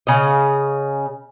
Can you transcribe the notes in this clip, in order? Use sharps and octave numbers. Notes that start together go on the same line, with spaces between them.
C#3 D#5